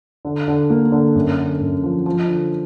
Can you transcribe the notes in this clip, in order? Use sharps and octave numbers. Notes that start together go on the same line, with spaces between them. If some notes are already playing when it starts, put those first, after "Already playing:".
D3
D3
A#3
D3
F#2
D3
F#2
F3
F3
D3